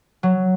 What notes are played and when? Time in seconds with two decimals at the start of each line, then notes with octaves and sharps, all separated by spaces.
0.23 F#3